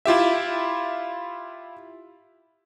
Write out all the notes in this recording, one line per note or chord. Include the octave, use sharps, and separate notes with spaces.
E4 F4 G4 E5